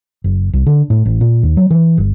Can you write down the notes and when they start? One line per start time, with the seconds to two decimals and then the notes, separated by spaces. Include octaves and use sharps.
0.24 F#1
0.53 C2
0.67 D3
0.90 A2
1.05 A1
1.21 A#2
1.43 D#2
1.57 F#3
1.71 E3
1.98 G1